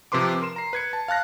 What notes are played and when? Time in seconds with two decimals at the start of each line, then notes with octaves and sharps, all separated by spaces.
0.12 C3 F3 B4 C6 D6
0.41 A#4 C6 E7
0.56 A#5 C7
0.73 B4 G#6 C#7
0.93 A5
1.08 F5 A5 F#6 A#6